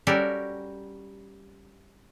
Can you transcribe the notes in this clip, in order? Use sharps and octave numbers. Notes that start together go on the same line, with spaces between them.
G3 C#4 F#4 G4 A4 A#4